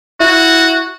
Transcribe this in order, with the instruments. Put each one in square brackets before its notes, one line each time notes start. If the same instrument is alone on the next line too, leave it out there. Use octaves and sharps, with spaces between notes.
[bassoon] E4 [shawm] F#4